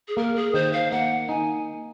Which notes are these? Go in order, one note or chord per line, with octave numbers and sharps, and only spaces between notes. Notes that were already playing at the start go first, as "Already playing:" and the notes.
G#4
A#3 A#4
G#4
D#3 C5
F5
A#3 F#5
D#4 G#5